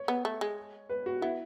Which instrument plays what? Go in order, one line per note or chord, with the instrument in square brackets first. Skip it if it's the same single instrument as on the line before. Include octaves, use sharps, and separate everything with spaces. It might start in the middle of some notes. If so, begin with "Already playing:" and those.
Already playing: [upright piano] C#5
[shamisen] B3
A3
G#3
[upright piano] B4
F#4
[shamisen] B3 [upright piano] E4